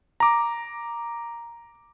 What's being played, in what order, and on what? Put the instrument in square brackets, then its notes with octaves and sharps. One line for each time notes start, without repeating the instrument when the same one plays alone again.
[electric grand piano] A#5 D6